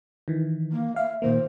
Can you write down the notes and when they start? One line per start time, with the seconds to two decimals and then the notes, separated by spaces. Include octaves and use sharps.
0.28 D#3 E3
0.72 A#3
0.96 E5 F5
1.22 A#2 D#3 A#3 C5